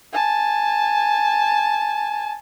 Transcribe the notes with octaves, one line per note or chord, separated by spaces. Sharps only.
G#5 A5